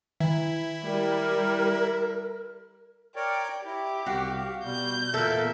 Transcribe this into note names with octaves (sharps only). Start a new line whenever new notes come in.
D#3 E4
G3 A#4
A#4 C#5 D5 G5
E4 G4
C2 F#4 F5
B2 G3 G6
E2 A#2 A#3 A4 A#4 E5